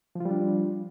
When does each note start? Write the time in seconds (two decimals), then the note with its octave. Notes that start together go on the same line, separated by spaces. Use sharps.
0.15 F3
0.20 F4
0.25 G3
0.30 D4